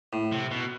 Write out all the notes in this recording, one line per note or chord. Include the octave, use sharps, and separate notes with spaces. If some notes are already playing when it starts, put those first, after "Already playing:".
A2
C3
B2